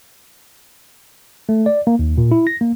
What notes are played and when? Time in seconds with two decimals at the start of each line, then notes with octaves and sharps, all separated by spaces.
1.49 A3
1.66 D5
1.87 A#3
1.99 D#2
2.18 A#2
2.31 E4
2.47 A#6
2.61 A#3